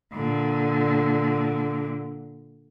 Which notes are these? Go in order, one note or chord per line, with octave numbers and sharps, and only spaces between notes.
A#2 D3